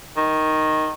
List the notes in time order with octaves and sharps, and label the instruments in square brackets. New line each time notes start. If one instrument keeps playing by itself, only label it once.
[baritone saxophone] D#3